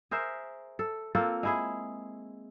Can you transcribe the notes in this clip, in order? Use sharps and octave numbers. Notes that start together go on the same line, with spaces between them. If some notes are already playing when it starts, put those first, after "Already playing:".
G#4 A#4 C5 E5
A4
A#3 C4 F4 A4
G#3 E4 G#4